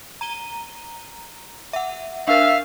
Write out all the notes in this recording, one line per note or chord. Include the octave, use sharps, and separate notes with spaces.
A#5 D#7 G7
E5 F#5
D4 A#4 E5 F5